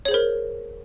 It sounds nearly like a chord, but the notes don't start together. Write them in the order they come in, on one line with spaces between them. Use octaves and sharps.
C#5 G#4 C5 A#4